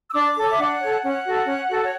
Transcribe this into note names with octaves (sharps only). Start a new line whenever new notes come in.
E6
D4 D6
A4 C#5
E5
D4 F#5
A4 C#5
C#4 F#5
F#4 A4
C#4
F#4 A4
C#5